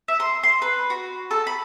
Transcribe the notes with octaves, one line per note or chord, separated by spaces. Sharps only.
E5
C6
C6
B4
F#4
A4
B5